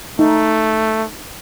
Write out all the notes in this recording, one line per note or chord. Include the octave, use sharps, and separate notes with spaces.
A3 D#4